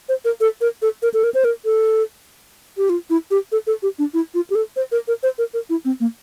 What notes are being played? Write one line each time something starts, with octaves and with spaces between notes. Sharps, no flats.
C5
A#4
A4
A#4
A4
A#4
A4
A#4
C5
A#4
A4
G4
F4
E4
G4
A4
A4
G4
D4
E4
F4
G4
A4
C5
A#4
A#4
C5
A#4
A#4
E4
C4
A#3